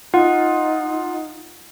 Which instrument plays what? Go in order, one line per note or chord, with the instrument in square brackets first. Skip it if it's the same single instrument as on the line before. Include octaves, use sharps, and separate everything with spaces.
[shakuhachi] D#4 [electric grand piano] F4 [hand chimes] F#5